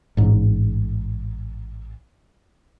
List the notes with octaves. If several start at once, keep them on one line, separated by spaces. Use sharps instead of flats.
A1 G#2